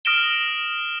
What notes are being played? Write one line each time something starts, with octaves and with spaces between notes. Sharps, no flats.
D#6 F6 A#6 D7 E7 G7